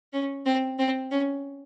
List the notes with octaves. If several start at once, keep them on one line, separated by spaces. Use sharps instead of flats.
C#4
C4
C4
C#4